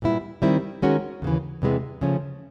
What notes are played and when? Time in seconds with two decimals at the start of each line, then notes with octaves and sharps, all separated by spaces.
0.02 A#2 G3 B3 E4
0.42 D#3 G3 C4 E4
0.82 D#3 G#3 C#4 F#4 A#4
1.22 D#2 C#3 E3
1.62 E2 C3 E3 G#3 B3
2.01 C#3 F3 A3 C#4